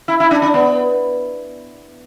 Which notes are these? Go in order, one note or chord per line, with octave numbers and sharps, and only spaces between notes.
E4
E4
D4
D4
B3